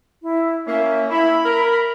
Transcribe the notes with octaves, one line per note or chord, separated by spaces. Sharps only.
E4
A#3 C#4 E5
E4 B5
A#4